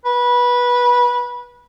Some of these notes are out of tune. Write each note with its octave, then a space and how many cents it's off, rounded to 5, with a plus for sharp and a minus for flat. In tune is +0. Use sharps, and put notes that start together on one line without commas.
B4 -20